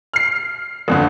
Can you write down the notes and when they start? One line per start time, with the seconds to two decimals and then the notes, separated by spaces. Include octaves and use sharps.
0.13 F6 C7
0.88 A1 F2 D3